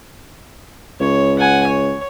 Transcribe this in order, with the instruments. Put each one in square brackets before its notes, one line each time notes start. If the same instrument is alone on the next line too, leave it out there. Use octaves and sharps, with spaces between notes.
[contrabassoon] C#2 [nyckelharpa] C#5
[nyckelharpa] F#5 G#5
C#5